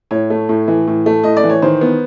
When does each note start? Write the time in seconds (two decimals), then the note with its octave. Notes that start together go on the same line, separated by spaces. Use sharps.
0.11 A2 C#5
0.30 A3
0.49 A2
0.68 E3
0.87 A2
1.06 A3
1.24 A2 D#5
1.37 D5
1.44 E3
1.50 C#5
1.62 D#3 C5
1.81 B3